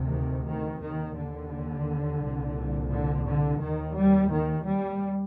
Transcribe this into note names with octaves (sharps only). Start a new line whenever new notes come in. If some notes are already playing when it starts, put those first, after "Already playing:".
Already playing: D2 C3
D#3
D#3
D#2 D#3
D3
C2 A#2
D3
D3
D#2 D#3
G3
D#3
G3